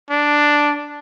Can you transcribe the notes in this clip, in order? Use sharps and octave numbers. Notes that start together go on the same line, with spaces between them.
D4